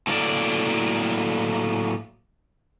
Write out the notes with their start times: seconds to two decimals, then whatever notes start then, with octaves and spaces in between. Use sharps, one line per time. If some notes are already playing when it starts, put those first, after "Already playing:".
0.07 A2 F#3 A#3 C4 A4 D5